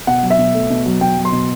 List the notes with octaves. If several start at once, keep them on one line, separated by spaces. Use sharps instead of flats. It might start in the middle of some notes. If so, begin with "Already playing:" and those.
B2 F#5
F#3
E5
B2
A3
B2
F#3
B2 G5
F#3
C6
B2